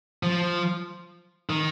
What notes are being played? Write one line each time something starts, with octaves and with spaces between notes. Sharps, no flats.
F3
D#3